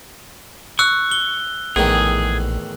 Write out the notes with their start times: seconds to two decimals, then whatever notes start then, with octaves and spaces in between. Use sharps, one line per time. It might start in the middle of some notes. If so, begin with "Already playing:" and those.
0.79 C#6 E6 F#6
1.11 G7
1.76 A#1 E2 A2 D#3 G#4